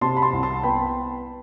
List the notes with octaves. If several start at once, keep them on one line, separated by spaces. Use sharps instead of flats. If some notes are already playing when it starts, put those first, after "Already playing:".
C3 A5 C6
B5
A5 C6
C2
A5 C6
B3 G5 B5